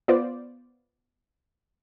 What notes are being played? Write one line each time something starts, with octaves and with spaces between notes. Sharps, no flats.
B3 F4 C5 D5